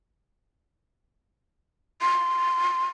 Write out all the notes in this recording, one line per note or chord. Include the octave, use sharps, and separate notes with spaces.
C6